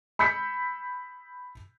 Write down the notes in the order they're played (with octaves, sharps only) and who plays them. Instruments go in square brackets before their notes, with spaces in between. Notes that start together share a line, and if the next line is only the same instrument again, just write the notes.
[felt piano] B5 E6 G6 B6 C#7